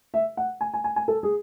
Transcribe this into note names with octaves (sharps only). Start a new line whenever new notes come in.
E5
F#5
G#5
G#5
G#5
G#5
A4
G#4